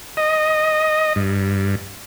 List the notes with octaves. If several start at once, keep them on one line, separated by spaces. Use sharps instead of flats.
D#5
G2